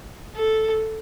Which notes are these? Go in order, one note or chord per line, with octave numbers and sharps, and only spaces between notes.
A4